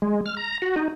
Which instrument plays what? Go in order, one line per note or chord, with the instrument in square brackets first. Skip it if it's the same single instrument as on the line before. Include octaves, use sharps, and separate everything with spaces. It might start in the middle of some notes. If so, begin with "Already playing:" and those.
[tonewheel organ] G#3
F6
A#5
F#4
D#4